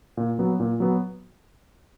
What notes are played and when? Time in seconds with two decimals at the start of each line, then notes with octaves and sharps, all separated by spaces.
0.17 A#2
0.39 F#3 B3
0.60 A#2
0.80 F#3 B3